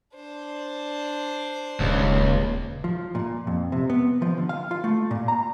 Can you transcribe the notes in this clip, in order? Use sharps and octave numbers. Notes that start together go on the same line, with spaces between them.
D4 C5
D#1 C#2
F3
A#2
F2
C3
B3
F3
D3
F5
F4
A3
A#2
A#5